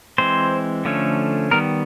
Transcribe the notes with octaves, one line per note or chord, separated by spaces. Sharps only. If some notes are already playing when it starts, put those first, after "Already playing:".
E3 G#3 C4 C5
D3 F3 A3 C#4
D#3 G3 B3 A#4